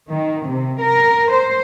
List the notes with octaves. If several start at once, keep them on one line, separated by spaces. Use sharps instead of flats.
D#3
C3
A#4
C5